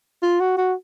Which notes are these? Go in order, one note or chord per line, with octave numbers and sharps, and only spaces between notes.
F4
F#4
F#4